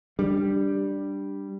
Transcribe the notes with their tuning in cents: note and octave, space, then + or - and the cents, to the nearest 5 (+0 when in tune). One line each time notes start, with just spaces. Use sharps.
G3 +0 D4 +0